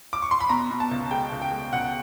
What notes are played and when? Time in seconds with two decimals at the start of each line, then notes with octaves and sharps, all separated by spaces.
0.13 D6
0.22 C#6
0.31 C6
0.41 B5
0.49 B2 A#5
0.71 B2
0.80 A5
0.91 C#2
1.11 G#3 G5
1.32 C#2
1.42 G5
1.52 G#3
1.73 C#2 F#5